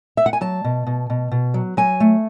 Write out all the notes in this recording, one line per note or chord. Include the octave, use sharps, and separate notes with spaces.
E5
F#5
G#5
F#3 A5
B2
B2
B2
B2
F#3
F#3 G#5
A3